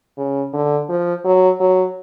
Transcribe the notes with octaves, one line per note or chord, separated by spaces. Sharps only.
C#3
D3
F3
F#3
F#3